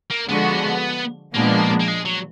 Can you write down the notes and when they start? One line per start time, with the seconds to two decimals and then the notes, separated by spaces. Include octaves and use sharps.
0.10 A#3
0.28 D3 F3 G#3 B3 D4 F#4
1.34 A#2 F3 G#3 A#3 B3 D4
1.80 A#3
1.88 G#3
2.06 F#3